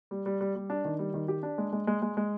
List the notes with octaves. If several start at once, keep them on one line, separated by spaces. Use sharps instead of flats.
G3
G3
G3
G3
D4
D#3
G3
D#3
G4
D4
G#3
G#3
G#3
G#3
G#3